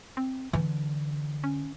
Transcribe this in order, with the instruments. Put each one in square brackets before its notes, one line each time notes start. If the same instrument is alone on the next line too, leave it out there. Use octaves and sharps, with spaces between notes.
[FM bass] C4
[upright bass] D3 [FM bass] E3
[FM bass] C#4